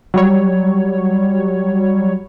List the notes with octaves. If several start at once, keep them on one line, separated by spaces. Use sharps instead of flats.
F#3 G3 C#5